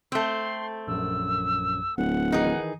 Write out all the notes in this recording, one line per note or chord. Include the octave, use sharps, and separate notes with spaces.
A3 C4 C6
A#1 F#2 E6
D1 F#5
D#3 E3 D#4 G#4